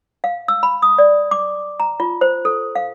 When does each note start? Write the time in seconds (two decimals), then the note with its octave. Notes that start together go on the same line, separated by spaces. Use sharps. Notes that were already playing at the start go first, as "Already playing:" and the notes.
0.24 F5
0.48 E6
0.63 B5
0.82 D#6
0.98 D5
1.31 D6
1.80 A#5
2.00 F4
2.21 C5
2.45 A4
2.75 F5